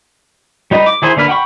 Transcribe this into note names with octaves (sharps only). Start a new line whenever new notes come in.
G3 D#4 B4 D#5
D6
D#3 E4 G#4 C5
D3 A#3 B4 F6
F#5 G5 B5 C#6